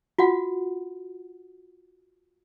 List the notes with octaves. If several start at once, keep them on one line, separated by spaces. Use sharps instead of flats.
F4 F#4 F#5